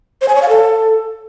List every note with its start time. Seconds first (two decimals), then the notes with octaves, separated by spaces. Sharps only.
0.22 C5
0.28 G#5
0.35 C#5
0.42 F5
0.49 A4